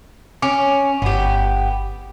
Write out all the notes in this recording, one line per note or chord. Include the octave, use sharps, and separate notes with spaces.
C#4 D6
G1 B3 G4